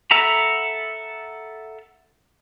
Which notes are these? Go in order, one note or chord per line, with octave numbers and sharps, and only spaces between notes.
A4 E5 F#5 A#5 B5